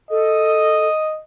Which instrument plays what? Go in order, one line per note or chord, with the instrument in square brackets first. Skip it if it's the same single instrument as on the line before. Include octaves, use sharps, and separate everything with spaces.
[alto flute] A4 [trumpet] D#5